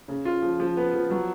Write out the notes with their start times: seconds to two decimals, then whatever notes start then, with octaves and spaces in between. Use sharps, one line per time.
0.08 C#3
0.25 F4
0.42 F3
0.60 F3
0.77 B3
0.94 F3
1.10 F#3